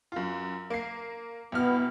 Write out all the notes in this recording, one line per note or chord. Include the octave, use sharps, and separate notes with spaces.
F#2 F4
A#3 C7
C2 B2 B3 F6